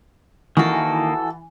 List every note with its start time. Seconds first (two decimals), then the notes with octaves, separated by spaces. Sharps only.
0.57 D#3 E3 A#3 F#4 A4